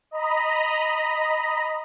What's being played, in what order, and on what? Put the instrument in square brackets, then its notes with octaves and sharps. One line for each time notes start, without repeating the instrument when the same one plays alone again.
[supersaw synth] D#5 A#5 B5